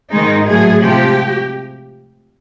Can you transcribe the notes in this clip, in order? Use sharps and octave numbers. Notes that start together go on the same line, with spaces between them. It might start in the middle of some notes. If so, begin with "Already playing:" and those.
G#2 D#3 G#3 D#4
A2 F#3 A3 G#4
C3 F3 G#3 G4